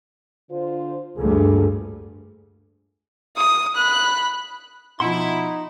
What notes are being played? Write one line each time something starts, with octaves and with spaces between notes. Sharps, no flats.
D3 F4 C5
D2 G2 A#2 G#4 A4
D#6
B5 F#6
B2 F3 D#4 E4 F#5 C6